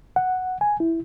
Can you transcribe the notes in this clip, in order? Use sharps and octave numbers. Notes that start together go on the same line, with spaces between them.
F#5
G#5
E4